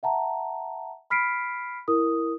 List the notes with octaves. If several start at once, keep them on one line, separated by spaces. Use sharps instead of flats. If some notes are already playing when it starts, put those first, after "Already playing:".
E5 F#5 A5 A#5
B5 F6 B6 C7 D7
E4 A#4 D#6